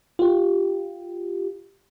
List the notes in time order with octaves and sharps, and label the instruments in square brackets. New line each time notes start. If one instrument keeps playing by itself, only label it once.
[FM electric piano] F4 G4